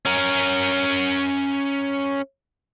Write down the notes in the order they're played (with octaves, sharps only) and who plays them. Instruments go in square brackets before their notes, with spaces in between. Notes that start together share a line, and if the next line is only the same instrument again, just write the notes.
[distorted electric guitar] C#4 A#4